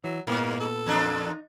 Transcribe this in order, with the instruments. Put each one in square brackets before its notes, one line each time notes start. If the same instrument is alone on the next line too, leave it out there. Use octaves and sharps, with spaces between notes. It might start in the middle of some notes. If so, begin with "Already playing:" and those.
[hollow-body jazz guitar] E3 [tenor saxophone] F#3
[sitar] G2 [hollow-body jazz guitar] A#2 B3 [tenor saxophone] A#3
[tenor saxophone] A4
[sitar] E2 A#3 D4
[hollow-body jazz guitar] D#4